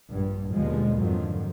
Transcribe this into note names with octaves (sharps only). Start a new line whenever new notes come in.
A#1 G2
D#2 B2 D3 F3 G3 G#3
F2 G#2 D3 D#3 F3 F#3